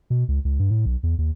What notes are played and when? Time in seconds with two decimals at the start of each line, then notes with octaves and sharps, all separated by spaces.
0.10 B2
0.28 C#2
0.45 C#2
0.59 G2
0.70 A2
0.86 B1
1.03 E2
1.18 D#2